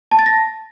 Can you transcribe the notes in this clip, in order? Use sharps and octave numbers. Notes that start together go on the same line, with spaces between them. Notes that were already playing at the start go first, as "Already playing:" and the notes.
A5
A6
A#6